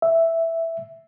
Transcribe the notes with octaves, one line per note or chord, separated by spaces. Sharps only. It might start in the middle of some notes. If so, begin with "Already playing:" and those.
E5